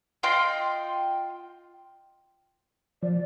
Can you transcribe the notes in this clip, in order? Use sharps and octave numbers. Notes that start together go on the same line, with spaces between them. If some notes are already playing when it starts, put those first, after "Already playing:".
F4 D#5 G5 C6
F3 D5